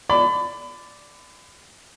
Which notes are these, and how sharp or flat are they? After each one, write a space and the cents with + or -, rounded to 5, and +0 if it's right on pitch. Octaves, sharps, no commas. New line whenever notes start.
D5 +0 B5 +35